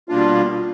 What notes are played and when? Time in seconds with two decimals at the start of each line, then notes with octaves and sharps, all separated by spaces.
0.09 B2 G3 A#3 D4 F4